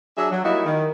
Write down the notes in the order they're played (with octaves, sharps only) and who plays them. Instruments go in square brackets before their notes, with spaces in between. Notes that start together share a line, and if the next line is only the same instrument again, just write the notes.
[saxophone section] F#3 D4 G#4 E5
F#3
G3 A#3 D#4 E4 F#4
D#3